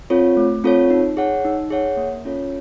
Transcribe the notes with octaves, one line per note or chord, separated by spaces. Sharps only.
C4 F4 A4 C#5
A3
C4 F4 A4 C#5
D#4
G#4 C#5 F#5
D#4
G#4 C#5 F#5
A#3
C#4 F4 A4 C#5